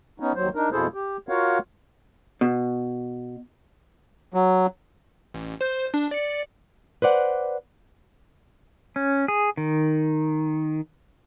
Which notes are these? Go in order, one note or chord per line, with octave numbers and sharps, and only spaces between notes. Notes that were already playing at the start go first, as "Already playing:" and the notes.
B3 C#4 D#4
D#2 F#3 C5
D4 D#4 A#4
F2 B2 E4 G#4 A4 C5
G4
F4 F#4 A#4 C#5 F5 F#5
B2
F#3
A1
C5 G6
D4
D5 C#7
B4 C5 D5 F#5
C#4
G#4
D#3